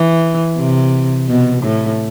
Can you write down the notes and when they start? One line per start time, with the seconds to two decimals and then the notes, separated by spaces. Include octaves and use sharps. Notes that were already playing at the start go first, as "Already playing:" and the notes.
Already playing: E3
0.58 C3
1.28 B2
1.63 A2